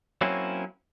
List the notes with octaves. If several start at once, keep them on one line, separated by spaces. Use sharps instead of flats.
F#3 A#3 C4 C#4 E4